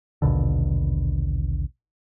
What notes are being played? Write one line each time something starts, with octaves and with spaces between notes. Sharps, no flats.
A#1 D#2 B2 D3